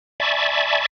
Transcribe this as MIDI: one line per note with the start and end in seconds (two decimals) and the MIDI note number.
0.20 0.86 74
0.20 0.86 76
0.20 0.86 80
0.20 0.86 81
0.20 0.86 83
0.20 0.86 85